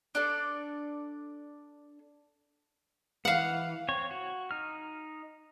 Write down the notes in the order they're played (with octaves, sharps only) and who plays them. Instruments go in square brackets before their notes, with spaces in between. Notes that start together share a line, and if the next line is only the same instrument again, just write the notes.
[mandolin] D4 A4 D5
[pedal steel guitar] E3 [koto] F5 F#5
[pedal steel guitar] C4 C#5
F#4
D#4 F6